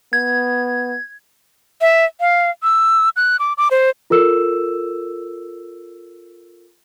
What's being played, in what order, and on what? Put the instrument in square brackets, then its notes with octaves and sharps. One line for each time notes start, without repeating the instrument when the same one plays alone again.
[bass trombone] B3 [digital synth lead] G#6
[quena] E5
F5
E6
F#6
D6
D6
C5
[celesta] F4 A4 A#4 E6 E7